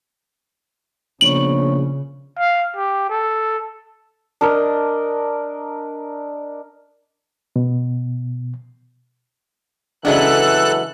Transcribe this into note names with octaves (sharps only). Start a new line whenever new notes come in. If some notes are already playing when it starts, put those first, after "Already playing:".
A#1 C#3 B3 C#5 C#6 F#7
F5
G4
A4
D4 A#4 D#5
B2
C#3 E3 F#3 G#3 B3 D4 A4 F#6